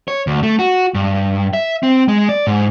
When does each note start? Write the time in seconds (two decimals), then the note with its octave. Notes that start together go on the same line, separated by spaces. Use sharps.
0.08 C#5
0.27 D2
0.43 A3
0.59 F#4
0.94 G2
1.53 E5
1.83 C4
2.08 G#3
2.29 D5
2.47 G#2